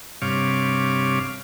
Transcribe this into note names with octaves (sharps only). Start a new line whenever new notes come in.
G2 C3 C#5 F5 D6